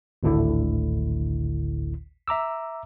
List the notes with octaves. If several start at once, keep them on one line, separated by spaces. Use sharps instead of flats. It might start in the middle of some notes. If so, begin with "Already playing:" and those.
G#1 D2 A2 D3 E4
E5 A#5 D6 E6